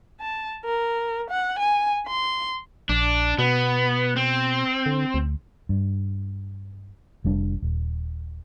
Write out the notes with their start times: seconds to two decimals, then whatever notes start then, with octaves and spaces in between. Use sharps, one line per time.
0.21 A5
0.65 A#4
1.30 F#5
1.59 G#5
2.07 C6
2.89 A#1 D4
3.38 B2 B3
4.16 C4
4.86 D3
5.14 D2
5.69 G2
7.24 F1 G3 D4
7.62 D#1